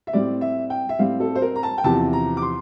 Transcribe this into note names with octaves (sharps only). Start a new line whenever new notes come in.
E5
A2 G3 C4 D5
E5
G5
E5
A2 G3 C4 F5
A4
C5
A#4
A#5
A5
G5
E2 C3 F3 A5
A#5
D6
C6